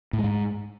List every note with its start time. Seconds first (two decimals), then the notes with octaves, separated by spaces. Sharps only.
0.13 A2
0.19 G#3
0.24 G#2